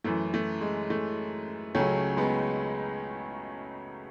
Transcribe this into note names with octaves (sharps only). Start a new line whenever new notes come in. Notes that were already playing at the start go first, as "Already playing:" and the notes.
F#2 E3 A3
A3
G#3
A3
C#2 C#3 F#3 A3 C#4
G#3 B3